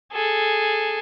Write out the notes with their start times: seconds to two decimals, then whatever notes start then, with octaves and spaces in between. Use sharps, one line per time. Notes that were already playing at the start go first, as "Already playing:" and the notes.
0.12 G#4 A4